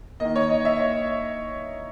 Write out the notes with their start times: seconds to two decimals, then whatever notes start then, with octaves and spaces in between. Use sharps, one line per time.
0.20 D#3 A#3 D#5
0.36 C#5
0.49 D#5
0.65 E5
0.80 C#5